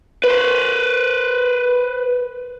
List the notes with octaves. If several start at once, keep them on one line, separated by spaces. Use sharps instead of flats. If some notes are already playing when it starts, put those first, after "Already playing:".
B4 C5